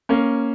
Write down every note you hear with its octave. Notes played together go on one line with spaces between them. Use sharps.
A#3 C#4